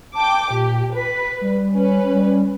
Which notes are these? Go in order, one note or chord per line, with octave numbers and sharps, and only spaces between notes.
G5 A5 D6
A#2 G4
B4 B6
G3
C#4 B4
G3